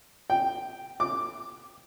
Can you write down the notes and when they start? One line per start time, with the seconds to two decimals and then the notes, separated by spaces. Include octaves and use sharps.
0.30 G5
1.00 D6